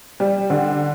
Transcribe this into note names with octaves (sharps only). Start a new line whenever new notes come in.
G3
D3